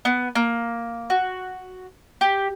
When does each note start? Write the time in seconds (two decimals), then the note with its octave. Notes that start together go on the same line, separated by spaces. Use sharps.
0.05 B3
0.35 A#3
1.10 F#4
2.21 G4